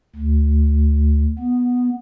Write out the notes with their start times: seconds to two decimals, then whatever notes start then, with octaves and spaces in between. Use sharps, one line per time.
0.16 D2
1.39 B3